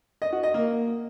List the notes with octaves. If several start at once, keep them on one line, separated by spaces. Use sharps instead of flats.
D#5
F#4
D#5
A#3